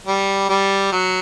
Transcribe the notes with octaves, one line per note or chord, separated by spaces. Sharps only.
G3
G3
F#3